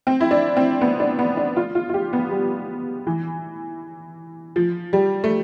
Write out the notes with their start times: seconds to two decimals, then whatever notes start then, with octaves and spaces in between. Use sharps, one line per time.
0.07 C4
0.20 E4
0.31 D4
0.57 C4
0.81 B3
1.00 D4
1.19 B3
1.37 D4
1.57 F4
1.75 F4
1.89 F4
1.94 G4
2.13 B3
2.31 G3
3.07 E3
4.56 F3
4.93 G3
5.24 A3